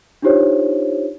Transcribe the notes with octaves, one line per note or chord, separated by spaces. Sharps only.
D4 D#4 F4 G4 C5 C#5